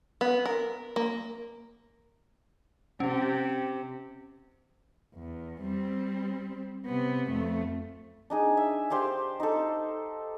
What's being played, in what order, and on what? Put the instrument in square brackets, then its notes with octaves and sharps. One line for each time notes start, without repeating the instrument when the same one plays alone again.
[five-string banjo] B3
A#4
A#3
[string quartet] C3 [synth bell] C#4
[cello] E2
G3 C4
C3 B3
F2 A3
[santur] D4 D#4 G#4
E5
G4 C5 D5 F5
D#4 A4